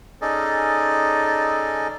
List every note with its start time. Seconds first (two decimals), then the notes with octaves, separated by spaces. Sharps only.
0.21 C#4 D#4 G#4 A4 D5 D#5